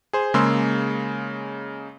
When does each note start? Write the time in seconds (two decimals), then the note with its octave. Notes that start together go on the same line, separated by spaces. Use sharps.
0.13 G#4 C5
0.34 C#3 G#3 A#3 C6 E6